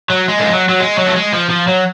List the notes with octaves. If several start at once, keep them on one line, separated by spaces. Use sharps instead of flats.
F#3
G#3
D3
F3
F#3
F#3
G#3
F#3
A3
G#3
F3
F3
F#3